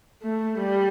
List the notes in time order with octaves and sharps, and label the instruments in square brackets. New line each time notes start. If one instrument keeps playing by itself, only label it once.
[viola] A3
G3